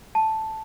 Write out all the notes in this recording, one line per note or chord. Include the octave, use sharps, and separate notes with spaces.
A5